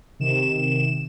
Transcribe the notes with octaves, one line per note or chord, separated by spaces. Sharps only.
C3 D#3 E7